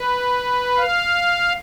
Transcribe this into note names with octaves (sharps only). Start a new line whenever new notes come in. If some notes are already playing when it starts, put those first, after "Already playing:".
Already playing: B4
F5